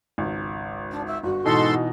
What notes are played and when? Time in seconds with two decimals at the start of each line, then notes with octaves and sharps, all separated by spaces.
0.18 G#1 C#2
0.91 D4
1.06 E5
1.23 G1 F#4
1.45 G#2 B2 E3 D#4 A4 C6